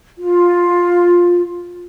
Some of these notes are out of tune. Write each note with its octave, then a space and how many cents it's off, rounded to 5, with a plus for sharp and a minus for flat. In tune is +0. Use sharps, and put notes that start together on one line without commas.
F4 +10